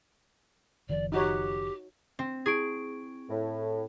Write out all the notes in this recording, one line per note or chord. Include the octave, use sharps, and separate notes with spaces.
F#1 D#3 F3 D5
D#4 F#4 G4 C#5
C4
E4 G#4 C#6 D7
A2